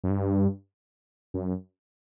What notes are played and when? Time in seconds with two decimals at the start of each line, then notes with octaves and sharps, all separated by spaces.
0.04 F#2
0.10 G2
1.34 F#2